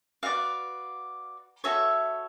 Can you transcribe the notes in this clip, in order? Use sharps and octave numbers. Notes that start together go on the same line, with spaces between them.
F#4 B4 D5 F5
F#4 A4 C#5 E5